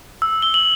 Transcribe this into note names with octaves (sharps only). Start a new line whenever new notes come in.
E6
E6 G7
F#7